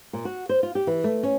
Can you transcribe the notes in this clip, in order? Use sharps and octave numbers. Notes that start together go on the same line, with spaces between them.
A#2
F#4
C5
F4
G4
E3
A3
C#4